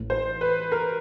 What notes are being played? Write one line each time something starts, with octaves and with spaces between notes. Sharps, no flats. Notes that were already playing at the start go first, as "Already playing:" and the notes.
Already playing: A1 A2 E3 A3
C5
B4
A#4